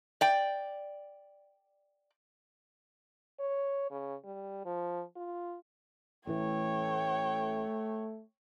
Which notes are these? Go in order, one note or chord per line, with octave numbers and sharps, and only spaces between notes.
D5 G5
C#5
C#3
G3
F3
F4
A1 A2 E3 A3 C#5 G5